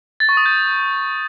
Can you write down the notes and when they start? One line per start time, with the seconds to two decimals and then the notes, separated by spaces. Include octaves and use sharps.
0.20 A6
0.29 C#6
0.37 D#6
0.46 G6